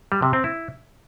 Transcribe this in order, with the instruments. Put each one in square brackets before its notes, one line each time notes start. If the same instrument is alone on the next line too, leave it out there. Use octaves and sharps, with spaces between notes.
[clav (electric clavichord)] G3
C3
C4
E4